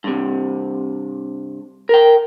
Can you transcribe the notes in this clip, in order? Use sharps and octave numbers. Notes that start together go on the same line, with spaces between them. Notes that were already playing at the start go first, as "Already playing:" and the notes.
G2 C3
A#4 G5